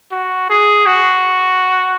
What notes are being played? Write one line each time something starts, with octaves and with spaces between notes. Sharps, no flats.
F#4
G#4
F#4